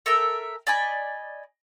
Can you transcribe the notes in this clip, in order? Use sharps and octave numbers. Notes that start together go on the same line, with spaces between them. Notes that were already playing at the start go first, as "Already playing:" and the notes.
A4 A#4 E5 G5
D5 D#5 G#5 B5